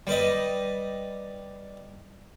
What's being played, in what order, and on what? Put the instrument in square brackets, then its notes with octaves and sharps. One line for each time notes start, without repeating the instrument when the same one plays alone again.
[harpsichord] G3 B4 D#5